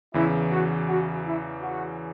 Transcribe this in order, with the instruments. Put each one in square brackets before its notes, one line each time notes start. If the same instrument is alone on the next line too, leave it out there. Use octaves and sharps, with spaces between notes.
[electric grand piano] E2 C#3 E3 [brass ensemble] E4
[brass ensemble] F#4
F#4
E4
F#4